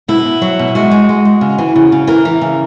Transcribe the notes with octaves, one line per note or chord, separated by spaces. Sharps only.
B2 E4
B2
F#3
B2
G#3 F#4
G#3
G#3
G#3
C#3
E3
C#3
C#3
E3 A#4
E3
C#3